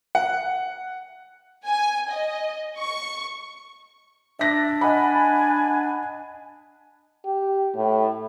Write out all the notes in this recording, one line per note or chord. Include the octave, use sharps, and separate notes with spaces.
F#5
G#5
D#5
C#6
D4 E5 A#6 B6
D#5 F#5 G#5 B5
G4
A2